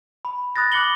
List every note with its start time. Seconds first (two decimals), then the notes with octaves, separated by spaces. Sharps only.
0.25 B5
0.56 B5 D#6 F#6 A6 A#6
0.72 B5 D6 F#6 C#7 F#7 G7